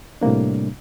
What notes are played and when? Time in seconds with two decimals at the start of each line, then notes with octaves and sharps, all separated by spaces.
0.21 A2 C3 G3 A#3 D4